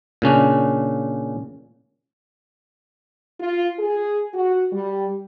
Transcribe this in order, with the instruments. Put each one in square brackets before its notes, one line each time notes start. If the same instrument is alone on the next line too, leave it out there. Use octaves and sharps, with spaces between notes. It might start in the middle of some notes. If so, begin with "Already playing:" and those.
[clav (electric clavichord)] A#2 C#3 C#4 D4
[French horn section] F4
G#4
F#4
G3